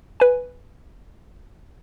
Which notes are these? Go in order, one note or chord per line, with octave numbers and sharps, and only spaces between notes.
B4 G#5